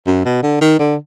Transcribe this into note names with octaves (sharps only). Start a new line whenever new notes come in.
F#2
B2
D3
D#3
D3